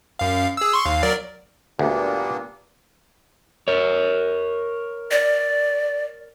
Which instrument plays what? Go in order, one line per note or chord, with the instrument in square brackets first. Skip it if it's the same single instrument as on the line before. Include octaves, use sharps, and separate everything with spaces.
[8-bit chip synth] F#2 F5
G#4 E6
C6 C#6
D#2 F5
F#3 A#4 D5
[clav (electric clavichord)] D2 [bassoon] G2 [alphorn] A#2 [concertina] A#3 B3 D4
[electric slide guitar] A#4 C#5
[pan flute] D5